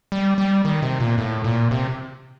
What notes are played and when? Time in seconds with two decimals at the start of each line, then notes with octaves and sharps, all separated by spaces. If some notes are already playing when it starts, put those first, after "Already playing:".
0.12 G3
0.38 G3
0.65 D#3
0.82 C3
1.00 A#2
1.18 A2
1.44 A#2
1.71 C3